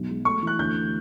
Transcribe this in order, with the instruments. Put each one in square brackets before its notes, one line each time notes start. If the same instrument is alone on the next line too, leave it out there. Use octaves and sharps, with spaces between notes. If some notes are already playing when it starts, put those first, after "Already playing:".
Already playing: [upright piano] B1
G#3
[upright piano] A3 [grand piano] C#6
[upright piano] E3 [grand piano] F#6
[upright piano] D2 [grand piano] G6